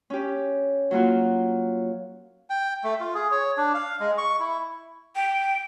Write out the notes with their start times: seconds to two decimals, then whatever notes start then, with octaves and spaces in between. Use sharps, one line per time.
0.10 C#4 G4
0.91 F#3 A#3 F4 F#4
2.50 G5
2.84 A3
3.00 F4
3.15 G#4
3.31 C#5
3.57 D4
3.74 F5
4.00 G#3
4.18 C#6
4.40 E4
5.15 G5